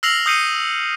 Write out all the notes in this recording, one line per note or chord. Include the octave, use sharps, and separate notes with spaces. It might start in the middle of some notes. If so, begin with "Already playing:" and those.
E6 F6 A#6 C7 F7 F#7
D#6 E6 G6 C7 C#7 D#7